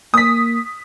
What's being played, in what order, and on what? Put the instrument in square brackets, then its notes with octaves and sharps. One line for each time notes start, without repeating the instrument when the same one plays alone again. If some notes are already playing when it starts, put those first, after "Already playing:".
[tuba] A#3 [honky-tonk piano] D#6 B6